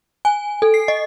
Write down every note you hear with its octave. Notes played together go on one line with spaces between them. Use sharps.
G#5
A4
C7
D#5